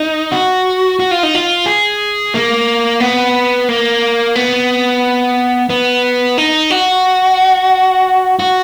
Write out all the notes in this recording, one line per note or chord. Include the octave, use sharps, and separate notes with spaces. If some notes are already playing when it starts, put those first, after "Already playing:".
Already playing: D#4
F#4
F#4
F4
D#4
F4
G#4
A#3
B3
A#3
B3
B3
D#4
F#4
F#4